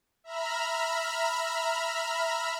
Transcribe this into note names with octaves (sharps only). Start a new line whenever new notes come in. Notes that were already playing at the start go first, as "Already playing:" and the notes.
E5 A#5 B5 F6